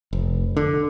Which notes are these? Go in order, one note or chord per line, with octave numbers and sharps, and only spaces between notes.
F1
D3